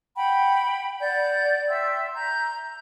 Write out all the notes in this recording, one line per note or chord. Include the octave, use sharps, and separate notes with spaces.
F#5 G5 B5
D5 F#5 G6
E5 G5 C6 E6
A#5 G6